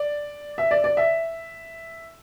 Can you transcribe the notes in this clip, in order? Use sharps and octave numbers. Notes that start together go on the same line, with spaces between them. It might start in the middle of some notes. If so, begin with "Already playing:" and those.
Already playing: D5
E5
D5
D5
E5